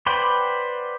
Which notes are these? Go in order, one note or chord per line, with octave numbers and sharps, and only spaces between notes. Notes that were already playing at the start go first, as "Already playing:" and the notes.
B4 C5 D5 F#5 G5